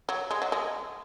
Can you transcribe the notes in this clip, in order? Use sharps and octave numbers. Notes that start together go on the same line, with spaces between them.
F#3
G#3
F#3
G#3